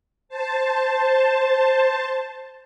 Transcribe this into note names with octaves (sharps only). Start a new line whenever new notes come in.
C5 A5